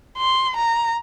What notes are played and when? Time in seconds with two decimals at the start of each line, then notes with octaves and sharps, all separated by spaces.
0.18 C6
0.57 A#5